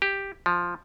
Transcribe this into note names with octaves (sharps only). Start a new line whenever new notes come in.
G4
F3